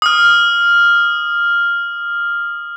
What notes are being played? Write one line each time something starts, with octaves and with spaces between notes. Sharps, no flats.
D#6 F6